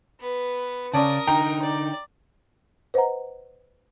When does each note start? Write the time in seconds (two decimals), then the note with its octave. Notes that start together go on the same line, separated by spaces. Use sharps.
0.20 B3 B4
0.94 C#3 C#4 A#4 D5 A5 D#6
1.27 D3 D#4 G5 A#5
1.62 D5
2.94 B4 C5 D#5 F#5 A#5